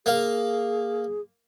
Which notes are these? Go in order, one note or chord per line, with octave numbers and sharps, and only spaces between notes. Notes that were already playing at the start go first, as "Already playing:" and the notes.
A#3 G#4 F5